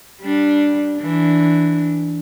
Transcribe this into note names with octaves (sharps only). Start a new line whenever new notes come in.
G3 D4
E3 D4